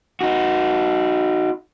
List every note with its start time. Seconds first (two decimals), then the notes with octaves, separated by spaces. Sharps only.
0.21 D#4 F#4